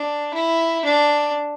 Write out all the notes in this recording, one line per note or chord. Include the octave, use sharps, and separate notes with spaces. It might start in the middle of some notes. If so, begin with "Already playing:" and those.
Already playing: D4
E4
D4